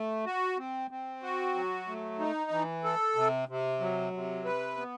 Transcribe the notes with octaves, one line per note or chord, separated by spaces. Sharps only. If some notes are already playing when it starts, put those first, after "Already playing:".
Already playing: A3
F#4
C4
C4
F#4
F#3
A3
D#4
E3
A4
C3
C3
F#3
C3
B4
B3